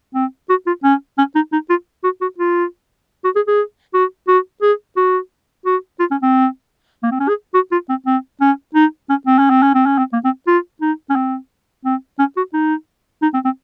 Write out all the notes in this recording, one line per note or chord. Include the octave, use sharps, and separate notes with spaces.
C4
F#4
F4
C#4
C#4
D#4
D#4
F4
F#4
F#4
F4
F#4
G#4
G#4
F#4
F#4
G#4
F#4
F#4
F4
C#4
C4
A#3
C4
C#4
G#4
F#4
F4
C4
C4
C#4
D#4
C#4
C4
C#4
C4
C#4
C4
C#4
C4
A#3
C4
F4
D#4
C#4
C4
C4
C#4
F#4
D#4
D#4
C4
C4